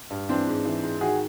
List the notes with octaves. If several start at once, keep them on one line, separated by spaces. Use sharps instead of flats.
G2
E3 C4 D4
G#2
E3
G#2
D#3 F#4 G#4